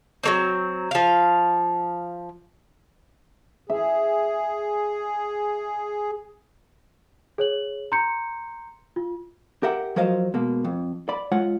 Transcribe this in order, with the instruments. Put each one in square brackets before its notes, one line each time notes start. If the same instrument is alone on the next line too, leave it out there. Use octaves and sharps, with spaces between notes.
[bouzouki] F#3 A#3 C4
F3 F5
[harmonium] G#4 [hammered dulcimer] E5
[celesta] G#4 C#5 F#7
A#5 C6 G6 C#7
F4
[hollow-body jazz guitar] G4 A#4 E5 F#5 G5
F3 F#3 A#4 C5 D#5 F5
B2 G#3 A#3
F2
D5 B5
G#3 F4 C#5 F#5